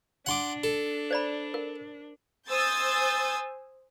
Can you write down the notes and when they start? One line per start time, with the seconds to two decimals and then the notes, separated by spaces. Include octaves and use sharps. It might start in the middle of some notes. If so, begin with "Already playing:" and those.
0.26 D4 F#5 C6 D6
0.64 A4
1.11 C5 D5 B5
1.54 A#4
2.48 C5 G#5 D#6 E6 G6 A6